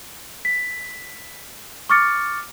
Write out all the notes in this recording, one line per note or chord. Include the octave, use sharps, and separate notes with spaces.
B6
C#6 D6 F6 A6 C#7